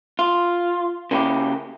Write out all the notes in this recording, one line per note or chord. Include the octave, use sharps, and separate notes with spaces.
F4
C#3 A#3 E4 G4